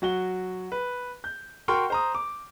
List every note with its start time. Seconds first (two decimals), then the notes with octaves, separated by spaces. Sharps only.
0.02 F#3 F#4 G7
0.72 B4
1.24 G6
1.68 F#4 A#4 G5 C6 C#6 F6
1.90 C5 A#5 D#6
2.15 D6